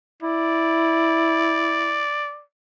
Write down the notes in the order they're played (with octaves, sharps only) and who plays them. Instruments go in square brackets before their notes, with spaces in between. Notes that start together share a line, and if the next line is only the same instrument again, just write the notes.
[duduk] E4 [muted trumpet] D5